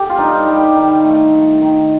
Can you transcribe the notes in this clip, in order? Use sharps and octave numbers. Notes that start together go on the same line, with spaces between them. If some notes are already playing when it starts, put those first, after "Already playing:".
Already playing: G4 A4
F4
G2 D#4
G3
D#3
A3
A3
D#3